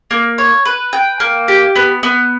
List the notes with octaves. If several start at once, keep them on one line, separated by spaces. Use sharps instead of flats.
A#3
C#5
B4
G5
A#3
G4
B3
B3